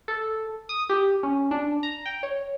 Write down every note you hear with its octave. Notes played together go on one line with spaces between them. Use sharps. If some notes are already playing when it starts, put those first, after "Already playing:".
A4
D#6
G4
C#4
D4
A#5
G5
C#5